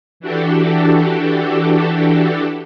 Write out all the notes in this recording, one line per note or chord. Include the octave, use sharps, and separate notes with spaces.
E3 D4 F#4 G4 A4